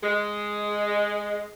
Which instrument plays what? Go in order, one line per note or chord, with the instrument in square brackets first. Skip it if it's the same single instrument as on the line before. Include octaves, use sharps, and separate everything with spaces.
[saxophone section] G#3